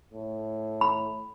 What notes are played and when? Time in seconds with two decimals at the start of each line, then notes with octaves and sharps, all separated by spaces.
0.14 A2
0.81 B5